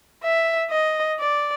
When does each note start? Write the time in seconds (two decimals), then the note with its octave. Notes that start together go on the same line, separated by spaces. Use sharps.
0.24 E5
0.71 D#5
1.20 D5